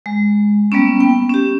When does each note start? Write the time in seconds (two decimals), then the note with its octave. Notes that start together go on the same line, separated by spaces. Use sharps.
0.06 G#3
0.72 G3 A#3 B3 C#4
1.00 B3 G5
1.30 C#4 G4